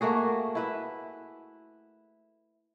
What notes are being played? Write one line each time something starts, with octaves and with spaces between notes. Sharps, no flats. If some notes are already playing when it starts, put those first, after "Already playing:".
A3 A#3 F#4 G#4
E4 B4 E5